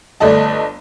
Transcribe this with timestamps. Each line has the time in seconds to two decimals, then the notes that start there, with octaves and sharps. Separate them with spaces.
0.20 G1 A3 D5 D#5 A5